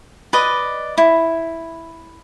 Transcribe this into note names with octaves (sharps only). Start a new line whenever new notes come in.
B4 D5 D#5
E4